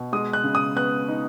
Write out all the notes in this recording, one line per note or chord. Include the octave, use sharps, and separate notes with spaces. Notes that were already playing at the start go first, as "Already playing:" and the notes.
Already playing: B2
G#3 D#6
F#6
C#3
D#6
B3 F#6
D#4